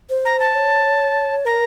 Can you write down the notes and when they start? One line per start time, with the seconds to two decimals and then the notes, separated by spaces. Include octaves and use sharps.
0.10 C5
0.25 A#5
0.40 A5
0.55 C#5
1.45 A#4 A#5